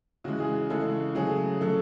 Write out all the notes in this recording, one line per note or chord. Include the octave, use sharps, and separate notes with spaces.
C#3 E3 G#3 F#4
G#4
C#3 E3 G#3 A4
C#3 F#3 A3 G#4
C#3 F#3 A3 A4